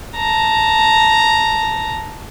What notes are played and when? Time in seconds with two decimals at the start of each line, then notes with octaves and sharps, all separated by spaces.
0.16 A5 A#5